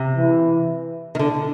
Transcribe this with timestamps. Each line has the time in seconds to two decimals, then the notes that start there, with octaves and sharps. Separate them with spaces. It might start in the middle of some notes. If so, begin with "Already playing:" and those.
Already playing: C3
0.16 E3
1.15 D#3
1.19 D3